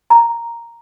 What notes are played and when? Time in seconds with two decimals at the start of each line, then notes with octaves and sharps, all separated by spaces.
0.10 A#5